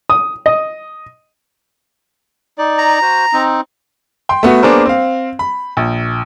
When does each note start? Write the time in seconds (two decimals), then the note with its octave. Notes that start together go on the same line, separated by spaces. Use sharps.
0.10 D#6
0.46 D#5
2.58 D#4 D5
2.79 A#5
3.02 F#4 C5
3.33 C4 D#4
4.29 G5 C6
4.43 A3 B3 F#4
4.62 A#3 B3 D4 G#4 A#4 C5
4.86 C4 F5
5.39 B5
5.77 A#1